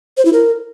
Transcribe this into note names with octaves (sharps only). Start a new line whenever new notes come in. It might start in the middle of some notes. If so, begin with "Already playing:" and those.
C5
E4
A#4